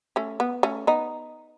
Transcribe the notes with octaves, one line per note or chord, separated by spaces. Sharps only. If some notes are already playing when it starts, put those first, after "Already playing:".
A3 C#4
B3
A3 C#4
B3 D#4